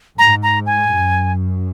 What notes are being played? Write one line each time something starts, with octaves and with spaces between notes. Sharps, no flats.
G#2 A#5
A#5
G#5
F#2